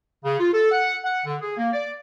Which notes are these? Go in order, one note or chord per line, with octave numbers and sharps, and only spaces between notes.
C#3
F4
A4
F#5
F#5
D3
G#4
A#3
D5